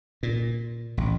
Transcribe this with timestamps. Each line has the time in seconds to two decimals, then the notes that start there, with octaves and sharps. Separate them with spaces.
0.23 A#2
0.97 A1